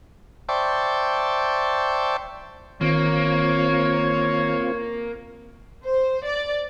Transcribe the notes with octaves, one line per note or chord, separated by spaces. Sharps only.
C5 D5 E5 G5 A5 C#6
G#1 D#3 A#3 C4 F4 C#5
C5
D5